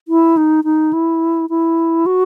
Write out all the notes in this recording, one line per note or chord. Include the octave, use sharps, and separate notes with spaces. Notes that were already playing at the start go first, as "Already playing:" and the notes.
E4
D#4
D#4
E4
E4
F#4